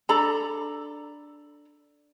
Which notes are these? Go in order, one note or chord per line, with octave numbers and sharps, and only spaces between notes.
D4 A4 A#5 B5